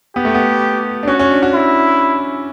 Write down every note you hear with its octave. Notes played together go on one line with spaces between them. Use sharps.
B3 G4
A3
B3
D4
C#4 F#4
C#4
D4
F#4
E4